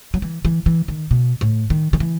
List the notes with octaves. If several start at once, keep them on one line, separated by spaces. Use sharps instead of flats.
F#3
E3
E3
E3
D#3
B2
A2
D#3
D#3
E3